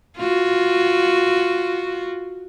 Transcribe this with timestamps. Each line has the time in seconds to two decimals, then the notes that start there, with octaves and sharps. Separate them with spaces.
0.17 F4 F#4